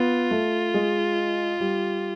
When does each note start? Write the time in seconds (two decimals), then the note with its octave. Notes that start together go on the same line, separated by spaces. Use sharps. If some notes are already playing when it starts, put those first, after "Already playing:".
Already playing: B3 F4
0.31 A3
0.74 G#3
1.60 G3